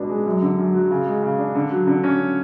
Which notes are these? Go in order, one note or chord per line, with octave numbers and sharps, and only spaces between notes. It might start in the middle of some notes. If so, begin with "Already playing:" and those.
Already playing: C#2 B2 D4
G#3
F#2
D3
F#2
F#3
C#3
G#3
C#3
D4
D3
F#3
D3
C#4